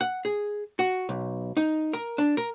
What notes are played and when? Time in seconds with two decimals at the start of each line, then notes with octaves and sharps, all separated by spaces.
0.01 F#5
0.25 G#4
0.79 F#4
1.09 B1
1.57 D#4
1.93 A#4
2.18 D4
2.37 A#4